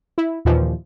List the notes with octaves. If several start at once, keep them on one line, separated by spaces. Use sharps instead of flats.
E4
D#2 A#2 E3 F3